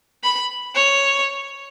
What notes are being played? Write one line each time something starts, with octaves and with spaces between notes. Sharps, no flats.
B5
C#5